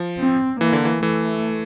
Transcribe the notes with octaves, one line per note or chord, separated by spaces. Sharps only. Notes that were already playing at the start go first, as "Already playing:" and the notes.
Already playing: F3
C4
E3 A#3
D3
E3
E3 A3